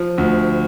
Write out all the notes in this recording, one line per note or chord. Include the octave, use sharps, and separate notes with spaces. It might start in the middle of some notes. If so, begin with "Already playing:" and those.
Already playing: F3
D2